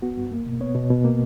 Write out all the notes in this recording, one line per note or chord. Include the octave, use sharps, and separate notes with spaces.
B3 F#4
G2
A#3
B2
B3 C#5
B2
B2
A#3